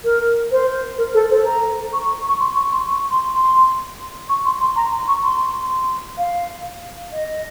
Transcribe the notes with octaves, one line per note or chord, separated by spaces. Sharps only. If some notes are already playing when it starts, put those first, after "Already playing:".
A#4
C5
A#4
A4
C5
A#5
C#6
C#6
C#6
C6
C#6
C6
C#6
C6
C6
C#6
C6
C6
A#5
C#6
C6
F5
D#5